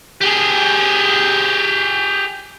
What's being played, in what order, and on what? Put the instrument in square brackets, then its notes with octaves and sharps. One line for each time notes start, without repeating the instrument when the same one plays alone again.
[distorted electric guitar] G4 G#4